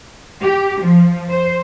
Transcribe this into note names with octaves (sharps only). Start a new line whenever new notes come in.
G4
F3
C5